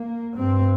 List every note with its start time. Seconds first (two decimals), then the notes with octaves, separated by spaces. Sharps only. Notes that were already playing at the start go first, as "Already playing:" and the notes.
Already playing: A#3
0.35 G2 C4